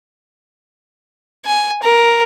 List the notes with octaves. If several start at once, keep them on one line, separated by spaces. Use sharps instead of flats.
G#5
A#4